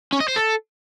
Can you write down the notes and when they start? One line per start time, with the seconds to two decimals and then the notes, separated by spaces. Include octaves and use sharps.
0.13 C#4
0.20 D#5
0.28 C5
0.36 A4